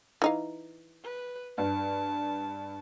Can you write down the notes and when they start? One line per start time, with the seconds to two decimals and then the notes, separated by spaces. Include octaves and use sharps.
0.22 E3 D#4 F5
1.04 B4
1.58 G2 A5